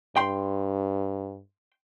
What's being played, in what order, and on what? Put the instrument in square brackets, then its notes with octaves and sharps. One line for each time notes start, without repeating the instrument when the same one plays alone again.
[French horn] G2 [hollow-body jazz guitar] G5 C6